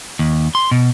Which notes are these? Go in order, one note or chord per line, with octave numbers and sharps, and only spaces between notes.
D#2
C6
B2